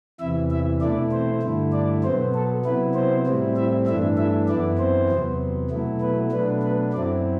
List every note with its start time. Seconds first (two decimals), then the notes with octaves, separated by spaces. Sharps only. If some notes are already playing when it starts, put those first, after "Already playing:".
0.20 E2 C3 E3 E4 E5
0.50 E4 E5
0.81 B2 A3 D4 E4 D5
1.12 C4 C5
1.42 G2 D3 A3 E4
1.73 D4 D5
2.03 B2 F#3 B3 C4 C5
2.35 A4
2.65 C3 F#3 B3 E4 B4
2.95 C4 C5
3.26 A2 G3 C4 E4
3.56 E4 E5
3.87 G2 E3 A3 D4 E4 E5
4.17 E4 E5
4.48 F#2 E3 B3 D4 E4 D5
4.78 C4 C5
5.09 E2 C3 F#3 B3
5.70 B2 F#3 A3 E4
6.01 B3 B4
6.32 B2 F#3 A3 B3 D4 B4
6.62 B3 B4
6.93 F#2 F#3 C4 D4 E4 D5